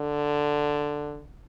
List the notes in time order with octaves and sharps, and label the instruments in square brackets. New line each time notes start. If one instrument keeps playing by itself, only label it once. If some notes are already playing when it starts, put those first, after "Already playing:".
Already playing: [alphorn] D3